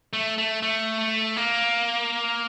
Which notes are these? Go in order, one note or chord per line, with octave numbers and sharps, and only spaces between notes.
A3
A3
A3
A#3